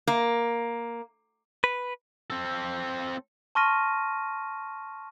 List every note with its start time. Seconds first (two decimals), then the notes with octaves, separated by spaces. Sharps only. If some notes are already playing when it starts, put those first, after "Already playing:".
0.07 A#3
1.64 B4
2.30 C4 A4
3.55 A5 C6 C#6 F6 A#6 D#7